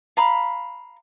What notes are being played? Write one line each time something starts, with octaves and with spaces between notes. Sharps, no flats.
F5 A#5 B5